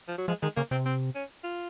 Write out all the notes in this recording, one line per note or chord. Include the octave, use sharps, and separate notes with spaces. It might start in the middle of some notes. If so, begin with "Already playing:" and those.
F3
F#3
F3 G#3
D#3 G#3
C#3 A#3
C3 C4
C4
C#4
F4